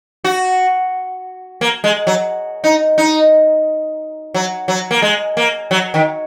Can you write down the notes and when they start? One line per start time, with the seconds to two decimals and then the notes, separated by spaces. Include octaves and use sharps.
0.24 F#4
1.61 A#3
1.84 G#3
2.07 F#3
2.64 D#4
2.98 D#4
4.34 F#3
4.68 F#3
4.91 A#3
5.02 G#3
5.37 A#3
5.71 F#3
5.94 D#3